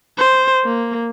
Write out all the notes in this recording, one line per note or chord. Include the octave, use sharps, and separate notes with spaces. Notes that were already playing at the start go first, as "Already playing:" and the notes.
C5
A#3